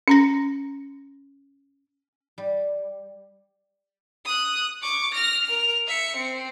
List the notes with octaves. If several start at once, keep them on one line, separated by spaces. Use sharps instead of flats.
C#4 A#5 A#6
G3
D#6 F#6
C#6 D6
F6 A#6
A#4 F7
E5 C#7
C4